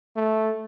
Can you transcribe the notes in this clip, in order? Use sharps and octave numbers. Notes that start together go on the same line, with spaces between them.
A3